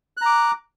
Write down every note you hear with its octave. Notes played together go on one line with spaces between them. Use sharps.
A#5 D6 F#6